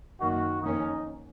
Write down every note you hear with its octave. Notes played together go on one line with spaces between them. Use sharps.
F#2 D#3 A#3 F#4
F2 D#3 A#3 C#4 D#4